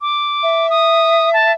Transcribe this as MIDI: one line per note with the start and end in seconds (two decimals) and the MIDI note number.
0.01 0.69 86
0.43 1.54 76
0.70 1.32 87
1.33 1.52 81